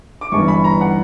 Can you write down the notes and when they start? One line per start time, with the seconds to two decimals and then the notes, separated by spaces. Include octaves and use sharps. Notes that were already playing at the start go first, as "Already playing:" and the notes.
0.21 D6
0.32 G1 G2 E3 C#6
0.48 B5
0.64 A#5
0.81 F#5